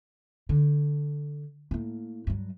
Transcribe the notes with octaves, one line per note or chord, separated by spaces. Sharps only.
D3
A2 A#3
G2 F#3